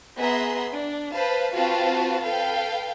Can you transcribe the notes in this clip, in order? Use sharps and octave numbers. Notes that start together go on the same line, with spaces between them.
B3 G#4 E5 A#5 C6
D4
B4 C5 F5 A5
C4 F4 F#4 B4 F5 A5
A4 B4 F5 G5